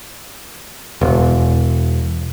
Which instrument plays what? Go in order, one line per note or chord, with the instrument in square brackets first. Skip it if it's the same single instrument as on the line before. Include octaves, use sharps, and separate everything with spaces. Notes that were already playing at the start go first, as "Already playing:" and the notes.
[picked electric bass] E1